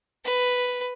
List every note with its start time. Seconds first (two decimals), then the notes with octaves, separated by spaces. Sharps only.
0.24 B4